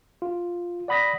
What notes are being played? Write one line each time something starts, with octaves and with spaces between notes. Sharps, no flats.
F4
D5 F#5 B5 D#6 A#6 B6